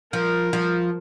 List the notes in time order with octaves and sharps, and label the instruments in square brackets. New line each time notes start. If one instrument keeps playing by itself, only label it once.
[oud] F3 [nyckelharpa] A#4
[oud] F3